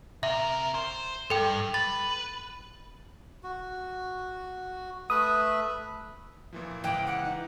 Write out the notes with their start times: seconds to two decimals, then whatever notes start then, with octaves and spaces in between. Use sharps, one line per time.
0.23 C3 A#4 E5
0.75 C5
1.30 G2 A4 G5
1.74 B4 A6
3.43 F#4
5.10 A3 B4 E5 D#6
6.53 A#2 E3 F3
6.84 C#2 E3 G5 D6 F#6
7.06 F#5
7.25 D#4